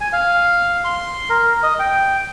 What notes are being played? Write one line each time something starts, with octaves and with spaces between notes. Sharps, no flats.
G#5
F5
C6
A#4
D#5
G5